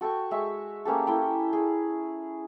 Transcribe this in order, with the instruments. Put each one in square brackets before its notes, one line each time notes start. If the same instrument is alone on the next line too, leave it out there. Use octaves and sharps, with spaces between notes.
[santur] F#4 A4 G5 C#6
G#3 E5 C#6
A#3 C#4 G4 A4
E4 A4 G5
G#4